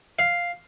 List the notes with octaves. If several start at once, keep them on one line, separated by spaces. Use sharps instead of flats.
F5